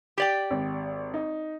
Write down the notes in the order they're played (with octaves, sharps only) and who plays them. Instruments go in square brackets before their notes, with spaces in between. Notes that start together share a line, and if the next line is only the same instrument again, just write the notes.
[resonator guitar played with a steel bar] G4 D5 G5
[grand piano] G#1
D#4